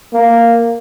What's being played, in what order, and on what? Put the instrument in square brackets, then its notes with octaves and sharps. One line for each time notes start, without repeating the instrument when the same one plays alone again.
[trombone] A#3